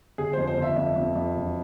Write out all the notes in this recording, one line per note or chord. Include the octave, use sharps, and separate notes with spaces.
G1 G#4
F2 C5
C5
G1 E5
F2 E5
F2
F2
E1